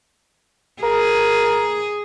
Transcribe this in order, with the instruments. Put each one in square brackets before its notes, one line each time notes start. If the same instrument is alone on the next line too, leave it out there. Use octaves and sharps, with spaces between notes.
[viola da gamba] G#4 [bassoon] A#4